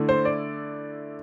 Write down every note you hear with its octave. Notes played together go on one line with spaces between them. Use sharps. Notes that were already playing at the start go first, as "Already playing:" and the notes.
Already playing: D3 A3 E4
C5
D5